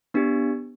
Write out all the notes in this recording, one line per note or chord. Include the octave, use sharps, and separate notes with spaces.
B3 D4 G4